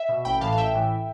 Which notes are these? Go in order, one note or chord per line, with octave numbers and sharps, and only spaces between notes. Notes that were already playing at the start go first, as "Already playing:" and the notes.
Already playing: E5
B2
A1 G5 B5
A2 E3 F5 A5
F5
A1 E5 G5
A2 E3